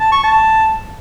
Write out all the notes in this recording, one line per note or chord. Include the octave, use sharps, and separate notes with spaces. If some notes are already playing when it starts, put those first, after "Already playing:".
A5
C#6
A5